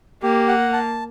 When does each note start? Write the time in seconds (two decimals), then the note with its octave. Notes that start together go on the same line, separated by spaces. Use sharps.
0.23 A#3 G4
0.48 F#5
0.73 A5